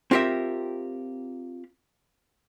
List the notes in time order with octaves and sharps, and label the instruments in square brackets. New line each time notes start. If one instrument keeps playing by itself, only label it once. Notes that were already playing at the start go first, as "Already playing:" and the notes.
[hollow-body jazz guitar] C4 F4 G4 A#4 E5